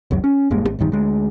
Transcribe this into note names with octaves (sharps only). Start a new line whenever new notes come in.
E1 C#2 F#2 F#3
C#4
E1 G2 G#3 A#3
G#1
E1 A#1 G2 D#3
D2 G#3